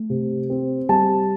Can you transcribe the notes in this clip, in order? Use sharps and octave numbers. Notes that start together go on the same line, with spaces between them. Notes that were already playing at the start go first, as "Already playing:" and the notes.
Already playing: A3
C3
C4
G3 A5